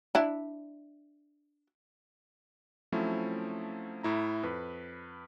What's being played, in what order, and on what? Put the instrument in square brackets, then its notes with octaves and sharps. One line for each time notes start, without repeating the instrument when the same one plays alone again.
[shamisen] D4 E4
[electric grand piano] F3 F#3 A3 C4 C#4 E4
A2 E4 A#5
F2 B4